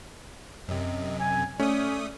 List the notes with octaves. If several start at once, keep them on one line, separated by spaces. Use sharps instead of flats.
F#2 C3 D#5
G#5
A3 C#4 D5 D#6